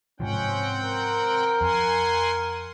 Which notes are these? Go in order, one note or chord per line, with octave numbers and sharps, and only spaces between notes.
G#2 C3 F3 C4 C#4 F#5 G5
A#4
F2 F#5 G#5 C6